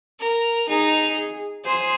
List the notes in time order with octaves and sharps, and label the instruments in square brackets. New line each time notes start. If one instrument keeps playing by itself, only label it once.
[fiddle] A#4
[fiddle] D#4 [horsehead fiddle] G#4
[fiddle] G#4 [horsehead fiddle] C5